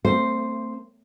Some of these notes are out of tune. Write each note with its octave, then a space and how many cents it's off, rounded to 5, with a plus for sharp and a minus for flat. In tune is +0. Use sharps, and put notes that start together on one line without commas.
A3 +40 C4 +0 C5 +0